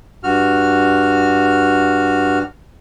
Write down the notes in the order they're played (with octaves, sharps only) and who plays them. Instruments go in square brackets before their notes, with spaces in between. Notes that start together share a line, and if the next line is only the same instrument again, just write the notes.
[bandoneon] G2 F#4 F6